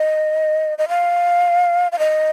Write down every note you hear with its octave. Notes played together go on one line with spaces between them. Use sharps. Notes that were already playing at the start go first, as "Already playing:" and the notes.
Already playing: D#5
D#5
F5
F5
D#5